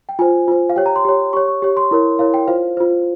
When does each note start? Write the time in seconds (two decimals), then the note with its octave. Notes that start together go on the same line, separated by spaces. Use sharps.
0.09 G5
0.19 F4 C5 G#5
0.48 F4 C5
0.69 F5
0.76 G4 C#5 G5
0.86 A#5
0.96 C6
1.05 G4 C#5
1.33 G4 C#5 C#6
1.48 C#6
1.62 G4 C#5
1.77 C6
1.91 E4 A#4 C#5
2.19 E4 A#4 C#5 F5
2.34 G5
2.48 F4 C5 F5
2.77 F4 C5